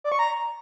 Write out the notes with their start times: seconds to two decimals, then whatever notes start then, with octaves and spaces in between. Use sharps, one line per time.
0.04 D5
0.12 C#6
0.19 A#5